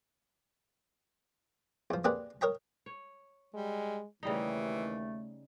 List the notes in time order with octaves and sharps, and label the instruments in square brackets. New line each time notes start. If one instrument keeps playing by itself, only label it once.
[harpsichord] E2 F3
A#3 C4 G4 G#4 B4 D5
A#4 C#5 D#5 G5 A#5
[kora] C#5
[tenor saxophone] G3 [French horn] G#3
[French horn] D#2 [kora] C#3 G3 D#4 [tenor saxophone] E3 [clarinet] A3